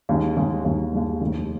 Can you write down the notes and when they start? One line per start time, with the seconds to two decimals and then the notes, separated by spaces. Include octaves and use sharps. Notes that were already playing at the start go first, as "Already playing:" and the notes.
0.09 D#2 D#3 G#3
0.37 D#2 D#3 G#3
0.64 D#2 D#3 G#3
0.93 D#2 D#3 G#3
1.21 F1 D#2 D#3